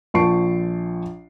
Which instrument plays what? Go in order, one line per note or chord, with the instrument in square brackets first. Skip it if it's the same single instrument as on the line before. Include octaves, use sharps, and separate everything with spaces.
[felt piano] A#1 F3 A5 C#6 C7 D7